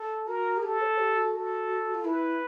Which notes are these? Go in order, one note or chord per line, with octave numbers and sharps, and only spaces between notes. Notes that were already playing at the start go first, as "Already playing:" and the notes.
Already playing: A4
F#4 A#4
G#4
G4 A4
C#5
G4
F#4
A4
F4
E4 B4